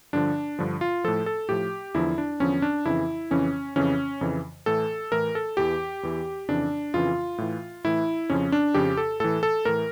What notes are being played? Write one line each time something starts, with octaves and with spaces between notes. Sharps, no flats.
G2 D3 F3 D4
G2 D3 F3
F4
A2 F3 A4
A4
A2 F3 G4
E2 D3 F3 E4
D4
E2 D3 F3 C#4
D4
F2 C#3 E3 E4
F2 C#3 E3 C#4
F2 C#3 E3 C#4
F2 C#3 E3
A2 E3 A4
A2 E3 A#4
A4
E2 E3 G4
E2 E3
F2 C#3 E3 D4
F2 C#3 E3 F4
A2 E3
A2 E3 E4
F2 C#3 F3 C#4
D4
F2 C#3 F3 G4
A4
A2 E3 A4
A4
A2 E3 A#4